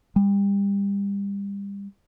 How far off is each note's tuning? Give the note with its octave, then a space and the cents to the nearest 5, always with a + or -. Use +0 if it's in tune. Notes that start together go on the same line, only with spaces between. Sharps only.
G3 +30